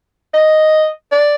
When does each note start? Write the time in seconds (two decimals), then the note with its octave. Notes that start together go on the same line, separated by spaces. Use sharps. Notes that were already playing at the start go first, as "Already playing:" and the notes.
0.34 D#5
1.12 D5